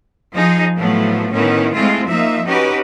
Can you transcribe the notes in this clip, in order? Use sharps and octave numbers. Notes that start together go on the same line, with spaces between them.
F3 D#4 G#4 D#5
A2 F3 F#3 A3 B3
A2 D#3 B3 C#4 E4
G#3 A3 C4 E4 F4
F3 A#3 D#4 E5
C#4 D#4 F#4 G4 B4